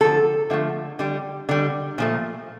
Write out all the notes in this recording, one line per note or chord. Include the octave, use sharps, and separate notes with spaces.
D3 F3 A3 A4
D3 F3 A3
D3 G3
D3 G3
A#2 F3 A3